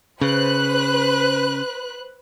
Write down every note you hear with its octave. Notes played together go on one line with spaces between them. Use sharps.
C#3 B4 C5 F#6